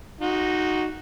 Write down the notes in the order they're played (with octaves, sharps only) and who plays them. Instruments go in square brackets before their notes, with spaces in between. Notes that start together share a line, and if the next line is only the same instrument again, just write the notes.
[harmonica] D#4 F#4